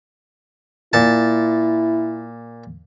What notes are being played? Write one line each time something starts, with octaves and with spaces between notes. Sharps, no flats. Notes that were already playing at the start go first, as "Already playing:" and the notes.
A#2 E4 A5